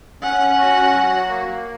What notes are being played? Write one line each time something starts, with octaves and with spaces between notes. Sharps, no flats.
C#4 F#5
F#4
F#3
A#3